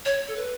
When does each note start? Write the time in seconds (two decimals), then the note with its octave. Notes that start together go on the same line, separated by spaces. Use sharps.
0.05 C#5
0.28 A4
0.36 B4